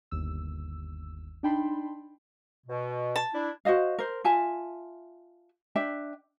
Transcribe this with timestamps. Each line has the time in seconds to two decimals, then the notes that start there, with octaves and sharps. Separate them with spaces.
0.11 G1 D#2 E6
1.43 D4 D#4 G5 A5 B5 C6
2.67 B2
3.16 A5
3.34 D4 E4
3.65 F#4 C5 D#5 F5
3.99 A#4 C5
4.24 F4 E5 G#5 A5
5.76 D4 E5 G5